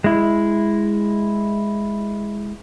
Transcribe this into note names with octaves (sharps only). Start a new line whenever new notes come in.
G#3 E4